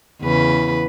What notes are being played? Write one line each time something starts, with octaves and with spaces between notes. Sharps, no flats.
E2 C#3 B4